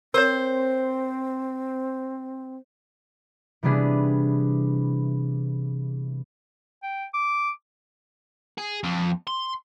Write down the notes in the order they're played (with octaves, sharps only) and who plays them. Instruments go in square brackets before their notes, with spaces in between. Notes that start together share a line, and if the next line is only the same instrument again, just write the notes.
[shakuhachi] C4 [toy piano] A#4 C#5 [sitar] C5
[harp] C3 E3 G3 B3 D4 G#4
[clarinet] G5
D6
[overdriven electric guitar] G#4
F2
C6